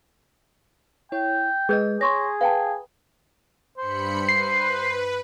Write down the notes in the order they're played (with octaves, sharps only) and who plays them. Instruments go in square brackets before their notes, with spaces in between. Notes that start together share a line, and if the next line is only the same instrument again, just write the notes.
[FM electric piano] E4 C#5 [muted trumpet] G5
[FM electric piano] G#3 D#5 [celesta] G#4 B4 G6
[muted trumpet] G#4 [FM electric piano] C#5 [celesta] C6 C#6 A#6
[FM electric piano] B4 [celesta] F5 G5 A5
[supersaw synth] G2 B5 C#7 [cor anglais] C5
[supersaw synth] B4 [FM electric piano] C7